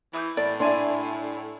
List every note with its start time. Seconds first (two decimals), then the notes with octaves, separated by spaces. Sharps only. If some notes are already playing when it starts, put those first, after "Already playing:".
0.13 E3 E4 D#6 G6
0.37 A2 D5
0.60 D4 E4 G#5 C6